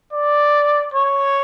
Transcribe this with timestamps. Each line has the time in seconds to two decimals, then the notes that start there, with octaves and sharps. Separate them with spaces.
0.13 D5
0.94 C#5